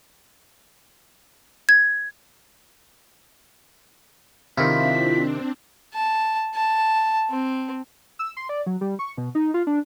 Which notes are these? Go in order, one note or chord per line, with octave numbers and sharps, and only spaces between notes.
G#6
C3 D#3 C4 D4 E4 F4 B6
A5
A5
C4
E6
C6
D5
F#3
G3
C#6
B2
D#4
F4
D4